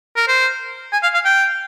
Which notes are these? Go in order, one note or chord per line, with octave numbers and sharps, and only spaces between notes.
A#4
C5
G#5
F5
F5
G5